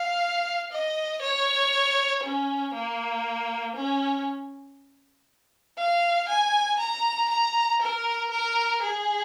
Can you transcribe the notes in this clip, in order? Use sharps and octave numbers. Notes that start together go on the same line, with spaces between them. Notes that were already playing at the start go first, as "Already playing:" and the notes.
Already playing: F5
D#5
C#5
C#4
A#3
C#4
F5
G#5
A#5
A#5
A#4
A#4
G#4